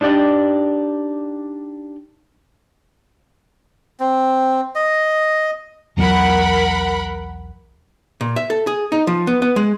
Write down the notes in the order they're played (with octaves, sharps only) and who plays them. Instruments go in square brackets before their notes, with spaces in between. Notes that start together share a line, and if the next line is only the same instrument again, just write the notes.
[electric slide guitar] D4 D#4 G4 D5 G5
[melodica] C4
D#5
[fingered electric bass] B1 E2 F#3 [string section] A#4 F#5 B5
[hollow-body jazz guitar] A#2
E5
A4
G#4
D#4
F3
B3
B3
G#3